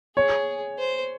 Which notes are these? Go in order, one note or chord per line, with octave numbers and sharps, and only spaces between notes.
G#4 C#5
C5